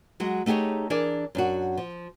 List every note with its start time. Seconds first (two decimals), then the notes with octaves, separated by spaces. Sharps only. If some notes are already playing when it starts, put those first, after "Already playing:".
0.20 F#3 G#3 F#4
0.46 A3 D#4 G4 G#4 C#5
0.90 E3 D4 G#4 A#4 D5
1.35 F#2 D4 F#4
1.77 F3